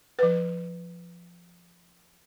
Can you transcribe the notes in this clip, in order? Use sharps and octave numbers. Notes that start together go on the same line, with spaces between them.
F3 B4